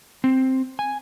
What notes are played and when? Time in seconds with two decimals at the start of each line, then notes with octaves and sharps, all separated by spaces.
0.24 C4
0.79 G#5